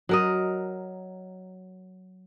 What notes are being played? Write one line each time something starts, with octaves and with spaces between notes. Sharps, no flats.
F#3 A#4 D#5